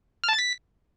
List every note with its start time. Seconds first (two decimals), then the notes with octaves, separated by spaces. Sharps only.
0.24 F6
0.29 A5
0.34 A6
0.39 B6